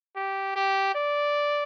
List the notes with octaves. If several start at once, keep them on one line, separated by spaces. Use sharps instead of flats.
G4
G4
D5